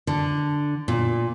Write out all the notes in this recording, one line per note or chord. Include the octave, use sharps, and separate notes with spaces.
D3
A#2